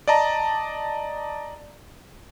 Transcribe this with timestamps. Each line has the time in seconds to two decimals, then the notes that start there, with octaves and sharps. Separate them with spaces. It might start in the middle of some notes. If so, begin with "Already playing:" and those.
0.08 D5 D#5 A5 A#5